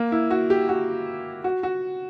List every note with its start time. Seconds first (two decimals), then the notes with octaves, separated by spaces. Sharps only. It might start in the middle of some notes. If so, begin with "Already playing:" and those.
Already playing: A#3
0.12 E4
0.31 F#4
0.50 G4
0.69 F#4
1.44 F#4
1.63 F#4